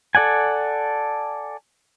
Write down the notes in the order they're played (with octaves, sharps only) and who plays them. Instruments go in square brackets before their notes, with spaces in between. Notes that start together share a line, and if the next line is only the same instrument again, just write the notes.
[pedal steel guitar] A4 D5 F#5 G#5